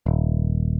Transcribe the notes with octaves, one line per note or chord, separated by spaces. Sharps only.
D#1